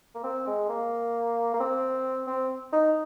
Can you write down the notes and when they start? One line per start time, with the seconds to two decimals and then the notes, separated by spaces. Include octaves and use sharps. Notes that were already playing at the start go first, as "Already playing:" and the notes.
0.15 A#3
0.24 C4
0.47 G#3
0.69 A#3
1.54 A#3
1.60 C4
2.27 C4
2.73 D#4